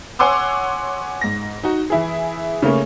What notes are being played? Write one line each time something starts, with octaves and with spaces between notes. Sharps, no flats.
C#5 F#5 G#5 C6 D6 E6
G#2 A#6
D#4 F#4
E3 E4 G#4
C#3 A3 A#3 C#4